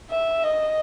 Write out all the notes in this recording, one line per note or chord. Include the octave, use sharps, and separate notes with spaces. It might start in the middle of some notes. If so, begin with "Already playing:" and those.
E5
D#5